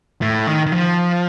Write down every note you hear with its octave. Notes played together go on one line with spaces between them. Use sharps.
A2
D#3
D#3
F3